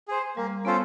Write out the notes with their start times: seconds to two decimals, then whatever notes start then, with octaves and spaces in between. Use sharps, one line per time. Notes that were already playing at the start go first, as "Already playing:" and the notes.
0.08 G#4 C5
0.37 G3 A#3
0.65 B3 C#4 F4 A4 C5